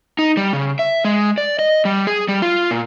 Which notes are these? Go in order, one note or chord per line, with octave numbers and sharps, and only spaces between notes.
D#4
G3
C#3
E5
G#3
D5
D#5
G3
G#4
G3
F4
A#2